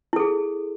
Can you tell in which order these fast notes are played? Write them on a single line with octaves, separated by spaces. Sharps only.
E4 A4 G#4